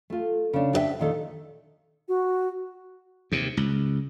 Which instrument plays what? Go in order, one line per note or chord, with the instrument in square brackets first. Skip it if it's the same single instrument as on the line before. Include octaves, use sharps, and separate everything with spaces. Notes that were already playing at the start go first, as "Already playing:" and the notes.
[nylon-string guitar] A3 F4
C#3 D4
D4 G4 A#4 E5 G5
A#2 D#3 A4
[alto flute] F#4
[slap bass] D#2 C3
C#2